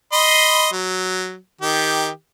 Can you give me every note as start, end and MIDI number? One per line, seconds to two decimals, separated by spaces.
0.13 0.67 75
0.13 0.67 83
0.13 0.67 84
0.72 1.35 54
1.61 2.08 51
1.61 2.08 67